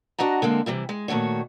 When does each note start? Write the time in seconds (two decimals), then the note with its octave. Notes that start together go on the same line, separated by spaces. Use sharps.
0.19 D4 F#4 D#5 F#5 A#5
0.42 D3 G#3 A#3 C4
0.66 C3 E3 G3 E4
0.89 G#3
1.08 A#2 D#3 A3 F#4 C#5